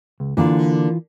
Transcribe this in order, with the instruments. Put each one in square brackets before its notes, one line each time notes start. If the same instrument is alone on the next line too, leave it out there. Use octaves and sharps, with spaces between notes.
[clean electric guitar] C#2
[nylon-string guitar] D3 A#3 [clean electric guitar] E3 F4